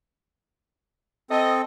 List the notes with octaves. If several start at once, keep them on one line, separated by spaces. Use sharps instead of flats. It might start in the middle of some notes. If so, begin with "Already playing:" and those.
C4 A4 D#5